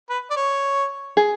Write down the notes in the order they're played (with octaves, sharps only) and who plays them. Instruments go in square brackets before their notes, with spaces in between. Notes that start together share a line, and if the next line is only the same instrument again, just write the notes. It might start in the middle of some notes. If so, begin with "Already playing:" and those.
[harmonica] B4
D5
C#5
[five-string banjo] G#4